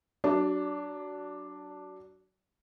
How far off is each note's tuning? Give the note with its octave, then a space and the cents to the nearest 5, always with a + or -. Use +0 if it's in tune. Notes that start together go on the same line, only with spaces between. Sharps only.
F#3 +20 D4 +0 D5 -25